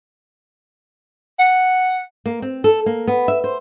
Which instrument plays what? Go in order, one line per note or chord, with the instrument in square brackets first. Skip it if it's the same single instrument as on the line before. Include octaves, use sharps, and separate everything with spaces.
[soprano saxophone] F#5
[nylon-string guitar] A#3
C4
A4
A#3
B3
E5
C5